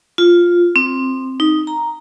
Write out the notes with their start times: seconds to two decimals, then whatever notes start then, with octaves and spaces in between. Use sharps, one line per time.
0.18 F4
0.76 C4
1.40 D#4
1.67 A#5